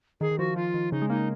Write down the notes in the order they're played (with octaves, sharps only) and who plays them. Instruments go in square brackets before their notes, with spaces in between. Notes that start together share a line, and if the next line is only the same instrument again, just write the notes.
[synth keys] D#3 [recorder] G#4
[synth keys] D#3
[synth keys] F3 [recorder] F#4
[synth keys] F3 [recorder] F4
[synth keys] D#3
[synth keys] C#3 [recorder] D#4
[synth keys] G#3
[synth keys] A#3 [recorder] D#4